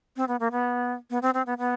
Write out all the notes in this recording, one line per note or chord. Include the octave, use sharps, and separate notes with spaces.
C4
B3
A#3
B3
B3
C4
C4
B3
B3